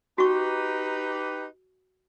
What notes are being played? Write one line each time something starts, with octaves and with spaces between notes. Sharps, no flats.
D#4 F#4 G4 B4 C#6